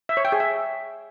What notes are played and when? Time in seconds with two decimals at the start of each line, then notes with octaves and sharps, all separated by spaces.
0.09 E5
0.17 C#5
0.25 G5
0.32 G#4
0.40 E5